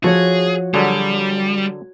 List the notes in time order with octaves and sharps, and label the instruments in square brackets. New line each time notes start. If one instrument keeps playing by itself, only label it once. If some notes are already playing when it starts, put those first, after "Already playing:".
[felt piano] F3 [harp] F#4 C#5 [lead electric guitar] G#4 [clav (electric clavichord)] A4
[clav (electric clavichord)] D3 F#3 G#4 [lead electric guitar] G3